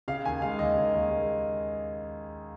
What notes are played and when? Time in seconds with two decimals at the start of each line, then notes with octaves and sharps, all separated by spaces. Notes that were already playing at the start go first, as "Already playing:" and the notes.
0.08 C#3 F5
0.25 D#2 G#5
0.42 G#3 F5
0.59 D#2 D#5
0.77 C#3
0.94 D#2
1.11 G#3